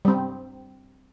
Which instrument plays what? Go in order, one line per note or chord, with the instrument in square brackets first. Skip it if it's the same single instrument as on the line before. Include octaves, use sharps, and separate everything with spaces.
[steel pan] G3 C4